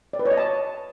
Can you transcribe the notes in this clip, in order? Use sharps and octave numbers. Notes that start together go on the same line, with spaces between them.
D5
B4
C#5
D#5
A5